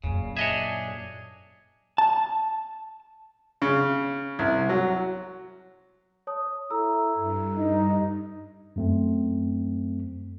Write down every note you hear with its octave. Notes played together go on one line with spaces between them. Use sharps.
F#2 A#2 C#3
D4 G#4 C#5 D#5 E5
A5
C#3
C2
F#3
C#5 A5 D#6
E4 A4 A#5 E6
G2
D#4 D#5
F#2 A3 C4